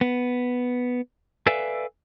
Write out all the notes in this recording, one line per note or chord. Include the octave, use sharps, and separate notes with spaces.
B3
A4 B4 D5 E5 F5 G#5